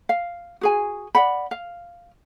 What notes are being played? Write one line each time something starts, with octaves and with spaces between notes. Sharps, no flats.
F5
F#4 G#4 G#5
D5 F#5 B5
F5